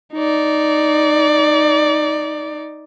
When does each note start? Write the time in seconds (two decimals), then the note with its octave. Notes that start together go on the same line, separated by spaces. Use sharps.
0.14 D#4 D5